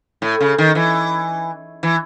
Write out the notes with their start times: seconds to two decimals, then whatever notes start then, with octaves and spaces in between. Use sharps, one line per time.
0.22 A2
0.41 C#3
0.58 D#3
0.75 E3
1.83 E3